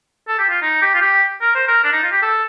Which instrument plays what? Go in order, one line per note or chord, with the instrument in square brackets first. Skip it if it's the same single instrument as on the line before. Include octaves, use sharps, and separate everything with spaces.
[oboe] A4
G4
F4
D#4
G4
F4
G4
A#4
C5
A#4
D4
D#4
F4
G4
A4